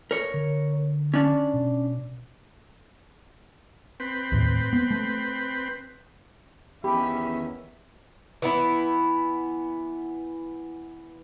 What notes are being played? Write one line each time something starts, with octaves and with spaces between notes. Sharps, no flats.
A#4 C#5
D3
C#4 D4
B2
C4 B4
D#2 A2
B3
A3
E2 D#3 B3 C#4 G4 E5 B5
E3 B3 E4